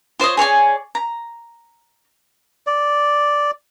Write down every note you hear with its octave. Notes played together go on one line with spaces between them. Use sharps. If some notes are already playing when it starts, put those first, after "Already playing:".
F4 C5 C#5 D#5
G#4 C#5 D5 G#5
A#5
D5